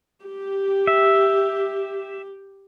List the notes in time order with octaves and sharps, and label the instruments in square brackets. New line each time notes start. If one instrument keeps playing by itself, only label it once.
[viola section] G4
[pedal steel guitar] E5